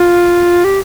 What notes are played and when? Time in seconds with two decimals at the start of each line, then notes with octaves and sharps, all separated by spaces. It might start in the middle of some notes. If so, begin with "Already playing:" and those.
Already playing: F4
0.64 G4